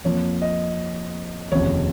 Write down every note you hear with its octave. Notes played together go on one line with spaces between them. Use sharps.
F2 F3 A#3 C#5
D#5
F1 D#2 C#3 F3 C#5